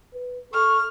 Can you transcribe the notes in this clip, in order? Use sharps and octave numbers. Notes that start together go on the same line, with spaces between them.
B4
A4 C#6 F6